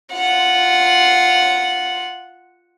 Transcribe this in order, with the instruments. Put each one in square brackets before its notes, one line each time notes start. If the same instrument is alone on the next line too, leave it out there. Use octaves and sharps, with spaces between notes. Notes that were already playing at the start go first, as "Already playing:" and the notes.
[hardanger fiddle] F4 F#5